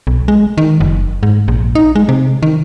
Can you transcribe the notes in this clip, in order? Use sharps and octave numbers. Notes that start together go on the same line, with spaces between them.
B1
G#3
D#3
F#1
G#2
A#1
D#4
G#3
C3
D#3